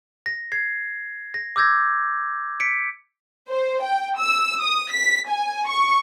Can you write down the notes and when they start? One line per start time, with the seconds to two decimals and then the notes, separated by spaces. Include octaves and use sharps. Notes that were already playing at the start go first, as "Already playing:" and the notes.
0.26 A#6
0.52 G#6 C7
1.34 A#6
1.56 D6 E6 G6 G#6 A#6
2.60 B6 C#7 D7
3.49 C5
3.82 G5
4.18 E6
4.62 D#6
4.92 B6
5.28 G#5
5.68 C#6